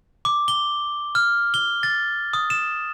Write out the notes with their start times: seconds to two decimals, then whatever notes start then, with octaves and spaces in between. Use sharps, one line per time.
0.25 D6
0.48 G7
1.15 F6
1.54 G7
1.83 A6
2.33 D#6
2.50 E7